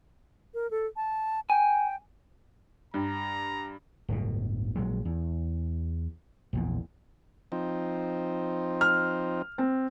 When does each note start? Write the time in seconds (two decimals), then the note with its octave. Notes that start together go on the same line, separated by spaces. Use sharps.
0.54 A#4
0.71 A4
0.96 A5
1.50 G5 G#5
2.94 G2 A#5
4.08 D1 G1 B2
4.76 A#1 F#3 G#3
5.05 E2
6.53 A#1 E2 A#2
7.52 F3 C4 D#4
8.81 F6
9.58 C4